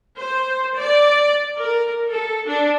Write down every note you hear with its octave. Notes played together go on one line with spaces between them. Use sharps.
C5
D5
A#4
A4
D4